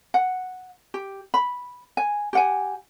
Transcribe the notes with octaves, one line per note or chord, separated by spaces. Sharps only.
F#5
G4
B5
G#5
G4 F#5 G#5